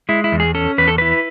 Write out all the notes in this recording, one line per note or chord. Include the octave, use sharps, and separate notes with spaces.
G#3 E4
E4
E2
G#4
C#4 A4
E2 B4
A4
E4 B4